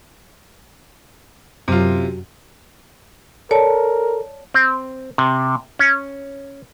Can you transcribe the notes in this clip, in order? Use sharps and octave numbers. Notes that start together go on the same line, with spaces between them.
F#2 C3 F4
A4 A#4 C#5 D5 A5
C4
C3
C#4